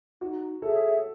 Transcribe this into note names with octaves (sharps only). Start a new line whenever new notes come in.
D#4 F#4
G#4 A4 C#5 E5